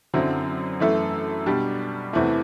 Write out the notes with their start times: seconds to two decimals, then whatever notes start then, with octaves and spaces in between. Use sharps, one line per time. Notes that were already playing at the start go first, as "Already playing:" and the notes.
0.14 F#2 D3 F#3 C4 E4
0.80 F#2 E3 A3 E4 A4
1.46 B2 G3 D4 G4
2.13 E2 C3 E3 A3 E4